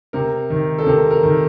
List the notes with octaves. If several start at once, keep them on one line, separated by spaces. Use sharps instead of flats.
C3 A#4
D#3
A4
C3 A#4
A#4
D#3